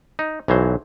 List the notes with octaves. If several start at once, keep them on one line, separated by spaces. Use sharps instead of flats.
D#4
B1 E3 F#3 C5